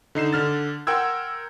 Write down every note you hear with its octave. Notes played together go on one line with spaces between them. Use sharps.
D3 D#4 C7 E7
D3 F6 A6
A#4 F#5 G5 C6 E6 G#6